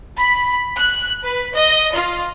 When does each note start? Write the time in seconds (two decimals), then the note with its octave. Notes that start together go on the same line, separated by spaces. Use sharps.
0.19 B5
0.78 F#6
1.24 B4
1.54 D#5
1.93 F4